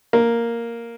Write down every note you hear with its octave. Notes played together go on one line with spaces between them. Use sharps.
A#3